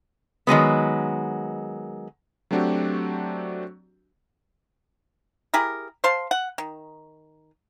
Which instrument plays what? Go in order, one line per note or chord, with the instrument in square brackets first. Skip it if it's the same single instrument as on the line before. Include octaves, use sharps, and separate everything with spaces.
[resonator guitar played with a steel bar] D#3 F#3 G#3 B3
[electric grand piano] F#3 A3 C4 D4 F#4 G4
[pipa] E4 G4 G#4 A#4
C5 F5 A5 C6
F#5
D#3